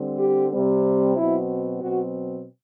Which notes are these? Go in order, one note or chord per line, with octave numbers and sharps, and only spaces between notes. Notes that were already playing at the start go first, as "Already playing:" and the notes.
Already playing: D3 G3 C4
G4
C3 G3 C4
B2 F#3 C4 E4
B2 F#3 C4 F#4